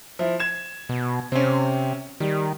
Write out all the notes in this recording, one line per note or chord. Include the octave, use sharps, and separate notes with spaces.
F3 E4
G#6 E7
B2
C3 C4 C#4
D#3 G3